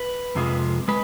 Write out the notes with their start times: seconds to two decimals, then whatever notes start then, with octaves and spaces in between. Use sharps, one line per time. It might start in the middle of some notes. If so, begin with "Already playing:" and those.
Already playing: B4
0.35 F2 C3 F3 G#3
0.88 G#3 B4